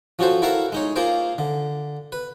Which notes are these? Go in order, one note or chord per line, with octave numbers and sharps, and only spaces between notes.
F3 C#4 F#4 A4 C5
E4 F#4 A4 A#4 E5 F5
G#3 D#4 C#5
A#3 F4 G#4 A#4 C5
D3
B4